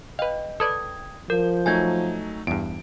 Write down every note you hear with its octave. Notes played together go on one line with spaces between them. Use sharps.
B4 D#5 F5 G5
A4 B4 D5 D#6 G#6
F3 A#4 G6
F#3 A3 D#4 G#5 G6 G#6
E2 G2 D7